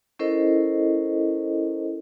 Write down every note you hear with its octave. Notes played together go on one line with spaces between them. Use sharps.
C#4 E4 A4 A#4 C5 D#5